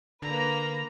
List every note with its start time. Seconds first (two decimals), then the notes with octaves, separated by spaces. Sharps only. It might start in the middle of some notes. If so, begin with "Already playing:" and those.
0.22 D3 A#3 B4 A#5